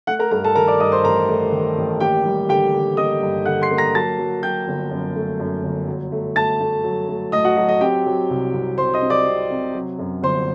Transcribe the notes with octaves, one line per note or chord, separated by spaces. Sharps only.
A3 F#5 F#6
A#4 A#5
G2 A#4 A#5
A4 A5
D#3 A#4 A#5
D5 D6
G2 D#5 D#6
C5 C6
A1 A#4 A#5
A3
D#3
A1
A#3 G4 G5
G3
D3 G4 G5
D3
A#3 D#5 D#6
G2
D3 F#5 F#6
C6 C7
A#3
A#5 A#6
F#3 A5 A6
F#3
F#3 G5 G6
G1
F#2
A3
F#2
G1
F#3
A3
A3 A5 A6
A3
F#3
A3
A2 D#5 D#6
F#4 F#5
F#3 D#5
D#5
C4 G4 G5
F#3
C2
C2
C2 C5 C6
D#5 D#6
C4
D5 D6
C3
C3
F#3
F#2
G1 C5 C6